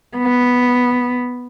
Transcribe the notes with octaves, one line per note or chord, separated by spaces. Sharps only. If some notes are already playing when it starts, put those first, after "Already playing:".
B3